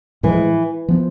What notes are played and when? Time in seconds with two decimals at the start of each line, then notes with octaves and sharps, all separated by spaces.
0.23 A2 E3 F3 G#3
0.88 F3 B3